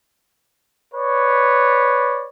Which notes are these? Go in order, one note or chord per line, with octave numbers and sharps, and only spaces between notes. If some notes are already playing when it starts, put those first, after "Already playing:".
B4 C#5 D5